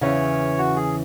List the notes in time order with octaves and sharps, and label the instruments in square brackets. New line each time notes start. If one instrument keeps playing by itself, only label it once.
[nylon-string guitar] E2 C#3 E3 [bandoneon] C#5
[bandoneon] F#4
G#4